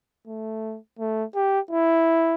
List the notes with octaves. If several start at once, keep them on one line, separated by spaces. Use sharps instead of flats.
A3
A3
G4
E4